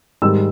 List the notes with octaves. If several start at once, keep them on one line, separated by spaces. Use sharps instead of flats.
G#2 D#3 G3 E6